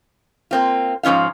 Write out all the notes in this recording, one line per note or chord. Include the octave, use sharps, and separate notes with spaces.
A#3 C4 F4
G#2 F3 C#4 F4 F5